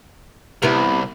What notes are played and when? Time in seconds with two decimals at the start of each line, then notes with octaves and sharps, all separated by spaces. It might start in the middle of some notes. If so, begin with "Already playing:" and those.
0.62 C2 C3 B3 E4